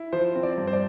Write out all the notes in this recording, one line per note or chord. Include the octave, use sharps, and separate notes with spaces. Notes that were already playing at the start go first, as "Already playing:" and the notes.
Already playing: E4
F3 C5
C4
D5
G2
C5
D5